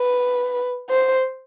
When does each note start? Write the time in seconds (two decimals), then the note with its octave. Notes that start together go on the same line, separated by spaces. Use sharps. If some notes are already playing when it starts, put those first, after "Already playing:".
Already playing: B4
0.90 C5